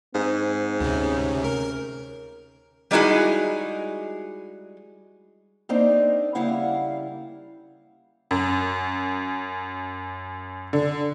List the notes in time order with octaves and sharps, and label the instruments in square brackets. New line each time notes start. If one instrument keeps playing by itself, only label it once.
[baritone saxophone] G#2 [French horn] C4
[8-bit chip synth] D2 C3 [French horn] C#4
[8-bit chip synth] A#4
[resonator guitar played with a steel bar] G3 G#3 D#4 E4 F#4 G#4
[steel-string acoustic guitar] A#3 C4 D4 D#4 D5
C#3 G3 A#3 E4 F5 F#5
[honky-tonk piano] F#2
D3